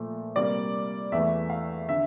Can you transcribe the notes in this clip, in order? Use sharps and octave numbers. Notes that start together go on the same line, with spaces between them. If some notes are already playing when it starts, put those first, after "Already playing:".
Already playing: A#2 F3 A3
C3 G3 A#3 D5
E2 E3 A3 E5
F5
D3 E5